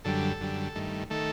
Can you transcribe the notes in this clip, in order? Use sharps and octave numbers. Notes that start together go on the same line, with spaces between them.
F#2 D3 G3 A4
F#2 D3 G3
G2 D#3 A3
D#3 A3 A4